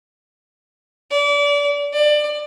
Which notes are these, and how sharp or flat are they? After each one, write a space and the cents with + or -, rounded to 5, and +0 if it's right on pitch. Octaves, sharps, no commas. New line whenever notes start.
D5 -30
D5 +25